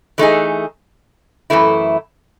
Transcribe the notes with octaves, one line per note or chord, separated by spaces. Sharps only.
E3 A3 D#4 G#4
F#2 E3 A3 E4